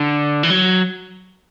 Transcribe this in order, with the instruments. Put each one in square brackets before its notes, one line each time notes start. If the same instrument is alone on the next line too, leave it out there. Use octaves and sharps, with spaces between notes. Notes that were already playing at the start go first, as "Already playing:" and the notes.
Already playing: [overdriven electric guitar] D3
E3
F#3